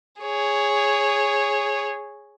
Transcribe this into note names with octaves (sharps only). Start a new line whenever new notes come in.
G#4 C#5